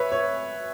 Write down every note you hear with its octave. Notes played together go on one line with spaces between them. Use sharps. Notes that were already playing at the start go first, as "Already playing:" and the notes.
Already playing: B4 C#5 E5
C#5